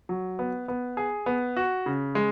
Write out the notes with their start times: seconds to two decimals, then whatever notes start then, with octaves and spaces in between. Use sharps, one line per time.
0.09 F#3
0.39 B3
0.68 B3
0.97 G#4
1.26 B3
1.57 F#4
1.86 C#3
2.15 G#3